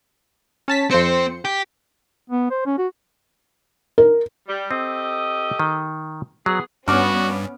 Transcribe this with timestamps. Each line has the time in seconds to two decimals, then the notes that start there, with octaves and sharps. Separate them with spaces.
0.68 C#4 A5 B6
0.91 F2 C4 C5 C#7
1.45 G4
2.30 B3
2.51 C5
2.66 C#4
2.78 F#4
3.98 A#4
4.48 G3
4.71 C4 G4 A4 D#5
5.60 D#3
6.46 F#3 B3 G#4
6.88 G2 B3 C#4 F#4 D6 F6